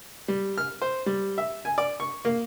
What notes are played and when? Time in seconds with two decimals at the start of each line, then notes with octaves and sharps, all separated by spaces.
0.28 G3
0.58 F6
0.82 C5
1.06 G3
1.38 E5
1.65 G#5
1.78 D5
2.00 C#6
2.25 A#3